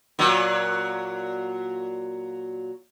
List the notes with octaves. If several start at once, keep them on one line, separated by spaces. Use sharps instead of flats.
A#2 F#3